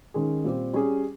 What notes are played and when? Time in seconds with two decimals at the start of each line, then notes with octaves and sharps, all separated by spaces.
0.14 D#3 G#3 C#4 G#4
0.44 A#2 G3 C4 G4
0.73 G3 C#4 G#4